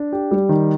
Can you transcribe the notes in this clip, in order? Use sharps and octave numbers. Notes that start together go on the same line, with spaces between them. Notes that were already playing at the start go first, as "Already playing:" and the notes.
Already playing: D4
G4
G3
D#3